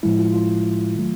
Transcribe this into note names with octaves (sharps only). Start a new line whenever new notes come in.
A2 F3 G#3 E4
F4
F4
D#3 F#3 A3